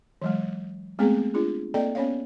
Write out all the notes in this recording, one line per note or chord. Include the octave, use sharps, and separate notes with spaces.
E3 F#3 G#3
G#3 A3 B3 C4 G#4
D4 F4 G#4
A#3 C4 A4 D5 D#5 G5
B3 C#4 C#5 F5